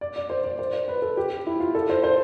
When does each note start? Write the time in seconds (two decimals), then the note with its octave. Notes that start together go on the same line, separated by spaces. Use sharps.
0.01 D5
0.16 D5
0.30 C5
0.44 D5
0.59 C5
0.73 C5
0.88 B4
1.02 A4
1.17 G4
1.46 E4
1.60 F4
1.75 A4
1.90 C5
2.04 C5